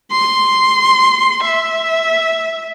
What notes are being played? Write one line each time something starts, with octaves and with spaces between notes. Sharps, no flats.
C6
E5